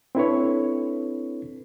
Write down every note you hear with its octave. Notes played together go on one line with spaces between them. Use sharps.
C4 D4 E4 A4 B4 C#5